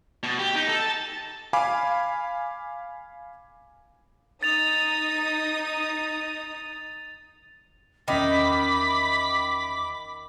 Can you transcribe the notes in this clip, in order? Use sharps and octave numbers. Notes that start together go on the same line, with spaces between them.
B2
G4
D#4
A4
A5
F5 G#5 B5 D6
D#4 D#6 A6 F7
E2 D#3 C#4 E5 B5 D6